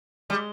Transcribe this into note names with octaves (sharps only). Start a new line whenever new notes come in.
G3 G#3